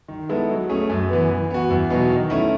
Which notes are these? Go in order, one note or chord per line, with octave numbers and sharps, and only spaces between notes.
D#3
G#3 B3 E4 A4
F#3
A3 C#4 G#4
F#2
E3 B3
E3
B3 F#4
E2
B2 F#3 B3 D#4
D#3
A3 C#4 E4